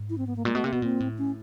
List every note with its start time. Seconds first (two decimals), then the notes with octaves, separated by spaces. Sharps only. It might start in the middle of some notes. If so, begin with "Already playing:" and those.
Already playing: G#2
0.10 E4
0.18 C4
0.27 B3
0.36 A#3
0.45 A#2 G#3
0.55 B2 A3
0.64 C3 A#3
0.72 B2 B3
0.82 A#2 C4
1.00 A2
1.18 C#4